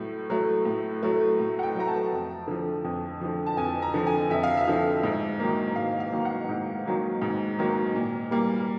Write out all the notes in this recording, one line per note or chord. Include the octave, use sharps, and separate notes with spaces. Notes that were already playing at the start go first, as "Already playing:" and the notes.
Already playing: A2 F#3 A3
F#3 A3
A2
F#3 A3
A2
F#5
G5
F#3 A3 A#5
A5
F2
D3 F3
F2
D3 F3
A5
F2 G#5
A#5
D3 F3
G#5
F2 E5
F5
E5
D3 F3
G#2
D#3 F#3 A#3
G#2 F5
F5
D#3 F#3 A#3
F#5
G#2
D#3 F#3 A#3
G#2
D#3 F#3 A#3
A#2
G3 A#3